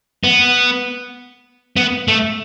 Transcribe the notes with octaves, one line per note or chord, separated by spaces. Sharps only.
B3
B3
A3